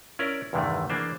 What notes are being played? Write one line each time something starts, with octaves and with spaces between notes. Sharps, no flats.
C#4 E4 A#4 D5
E2 G2 C3 D#3 E3 A3
E3 A#3 D4 G#4 C5